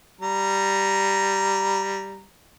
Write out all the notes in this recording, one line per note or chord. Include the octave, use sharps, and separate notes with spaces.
G3 A#5